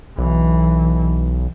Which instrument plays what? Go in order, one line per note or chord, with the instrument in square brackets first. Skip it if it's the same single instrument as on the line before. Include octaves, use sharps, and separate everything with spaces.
[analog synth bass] B1 [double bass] E3